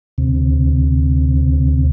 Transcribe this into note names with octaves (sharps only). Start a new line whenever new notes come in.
D2 C3